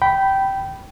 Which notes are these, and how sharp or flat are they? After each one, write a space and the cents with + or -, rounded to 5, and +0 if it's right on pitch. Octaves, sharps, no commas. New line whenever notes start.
G5 -15 B5 +0